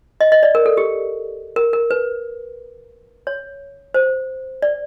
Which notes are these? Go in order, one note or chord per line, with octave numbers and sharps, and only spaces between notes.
D#5
D#5
D5
A#4
A4
G4
A#4
A#4
B4
C#5
C5
D5